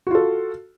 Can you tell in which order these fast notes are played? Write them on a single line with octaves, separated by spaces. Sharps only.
F#4 F4 A4